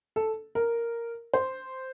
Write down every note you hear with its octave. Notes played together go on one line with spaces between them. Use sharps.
A4
A#4
C5